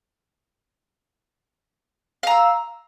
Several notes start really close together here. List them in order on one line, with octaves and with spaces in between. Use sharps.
F5 A#5 E6